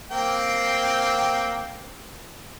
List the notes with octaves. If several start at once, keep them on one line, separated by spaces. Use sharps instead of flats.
A#3 C4 G5